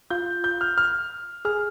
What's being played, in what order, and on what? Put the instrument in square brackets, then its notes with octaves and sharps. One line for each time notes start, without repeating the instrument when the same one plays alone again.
[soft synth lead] F4 [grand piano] G6
[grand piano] G6
F6
F6
[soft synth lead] G#4 [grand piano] F6